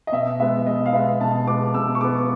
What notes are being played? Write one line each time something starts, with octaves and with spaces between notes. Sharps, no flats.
D#5
B2 E5
G#3 B3 E5
B2 D#5
F5
G#3 B3 E5
B2 A5
G#3 B3 D6
B2 E6
C#6
G#3 B3 D6